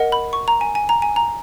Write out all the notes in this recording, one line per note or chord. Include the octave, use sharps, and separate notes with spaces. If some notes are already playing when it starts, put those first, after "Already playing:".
Already playing: A#4 D#5 F#5
B5
C#6
A#5
G#5
G#5
A#5
G#5
A#5